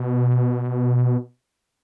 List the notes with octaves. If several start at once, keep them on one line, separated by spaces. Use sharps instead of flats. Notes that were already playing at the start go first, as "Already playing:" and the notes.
Already playing: B2